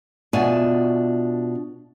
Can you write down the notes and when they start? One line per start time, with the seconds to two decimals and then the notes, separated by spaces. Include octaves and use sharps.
0.33 B2 D4 F4 E5 G#5